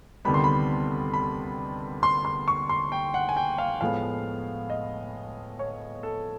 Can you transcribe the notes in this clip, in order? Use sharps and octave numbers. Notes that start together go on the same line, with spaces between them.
D2 C3 D#3 G3 B3 B5
C6
B5
B5
C6
C6
C#6
C6
G5
F#5
G#5
G5
F5
A2 F3 G#3 B3 F5
D#5
C#5
A4